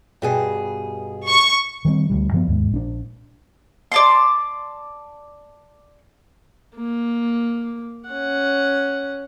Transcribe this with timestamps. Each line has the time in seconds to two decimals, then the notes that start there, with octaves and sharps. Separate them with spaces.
0.22 G2 B2 G#4
1.28 C#6
1.85 D#3 G3 G#3 C4
2.10 D2 E3 G3
2.32 G2 F3 B3
2.48 D#2 G#2
2.71 A#1 C#4 D4
3.92 D5 A5 C6
6.76 A#3
8.09 C#4 F#5